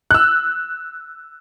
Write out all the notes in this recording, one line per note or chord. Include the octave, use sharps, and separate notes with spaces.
E6 F#6